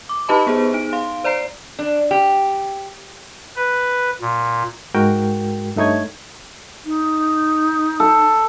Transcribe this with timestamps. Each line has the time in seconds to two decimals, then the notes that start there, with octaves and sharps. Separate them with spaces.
0.09 D6
0.28 D#4 G4 B4 D#5 A5 B5
0.47 B3 G#4 C5
0.74 D#4 D7
0.93 F5 C6
1.24 C5 D5 A#5 C7 D7
1.79 D4
2.11 G4
3.55 B4
4.21 A#2
4.94 G#2 G#3 F#4 A#4 G5
5.76 G2 A3 D#4 C#5 G#6
6.85 D#4
8.00 A4